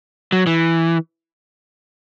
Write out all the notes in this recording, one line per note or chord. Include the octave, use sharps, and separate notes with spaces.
F#3
E3